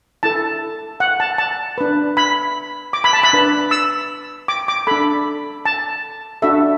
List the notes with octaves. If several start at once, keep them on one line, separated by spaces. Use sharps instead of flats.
E4 A4 A5
F#5
A5
A5
D4 B4
B5
D6
B5
A5
B5
D4 B4
E6
D6
D6
D4 A4 B5
A5
D4 F#4 A4 E5